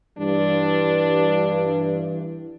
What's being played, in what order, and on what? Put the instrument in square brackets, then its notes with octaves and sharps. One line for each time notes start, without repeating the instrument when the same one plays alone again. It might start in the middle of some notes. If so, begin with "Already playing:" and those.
[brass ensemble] G2 [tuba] E3 [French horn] D4